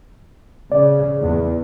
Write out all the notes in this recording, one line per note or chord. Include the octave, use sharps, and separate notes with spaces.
C#3 D5
E2